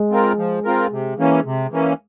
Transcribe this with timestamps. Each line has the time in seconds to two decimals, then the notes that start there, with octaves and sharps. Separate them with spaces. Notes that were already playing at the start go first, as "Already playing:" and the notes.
Already playing: G#3
0.11 C4 F4 A#4
0.38 F3
0.65 C4 F4 A#4
0.92 C3
1.19 E3 A#3 C#4
1.45 C3
1.72 E3 A#3 C#4